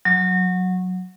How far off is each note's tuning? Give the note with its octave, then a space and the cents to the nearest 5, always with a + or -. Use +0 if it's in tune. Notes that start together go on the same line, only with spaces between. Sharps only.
F#3 -15